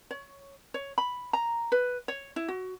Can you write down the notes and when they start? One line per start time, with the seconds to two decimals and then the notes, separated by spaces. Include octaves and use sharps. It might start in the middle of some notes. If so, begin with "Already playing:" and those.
0.11 C#5
0.74 C#5
0.98 B5
1.33 A#5
1.72 B4
2.08 C#5
2.36 E4
2.48 F#4